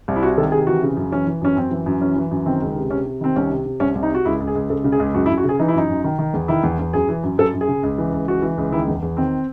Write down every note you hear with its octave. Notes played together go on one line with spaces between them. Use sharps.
C2
E4
C3 F#4
D#3 A4
C3 G#4
E3 F#4
C#3
F#2
E3 C#4
E3
F#2 C#4
F#2 C4
E3
F#2
E3 C#4
E3
F#2
D#3 C4
C#2
C3
C3 C#4
C3
D#3 C4
C2 C#4
C3
C3
C2 C#4
C2
D#4
C3 F#4
C#2 E4
C#2
G#4
C#2
C#2 A4
C#3
G#4
C#2
F#2 F#4
E4
F#2
F#4
C#3 G#4
E3 D#4
E4
F#2 D#4
F#2
D#3
D#3
E2
D#3 E4
E2
E2
F#2 G#4
E3
F#2
F#2 A4
F#2
G#4
C#3
C#2
E3
C#2
E3 F#4
E3
C#2
D#3 E4
E2
E2
D#3 C4